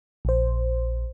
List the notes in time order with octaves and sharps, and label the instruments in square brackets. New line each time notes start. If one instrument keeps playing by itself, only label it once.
[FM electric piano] A#1 C5